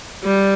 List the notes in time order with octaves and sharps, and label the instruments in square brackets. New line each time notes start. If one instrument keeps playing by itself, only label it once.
[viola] G3